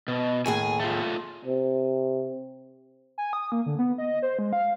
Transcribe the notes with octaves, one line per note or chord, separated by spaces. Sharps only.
B2
D#2 A2 G#4 G#5
A3 F4
C3
G#5
D#6
A#3
D3
B3
D#5
C5
G#3
F5